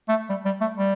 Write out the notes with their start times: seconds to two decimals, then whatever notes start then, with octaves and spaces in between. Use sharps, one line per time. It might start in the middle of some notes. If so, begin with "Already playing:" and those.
0.08 A3
0.29 G3
0.45 G3
0.61 A3
0.77 G3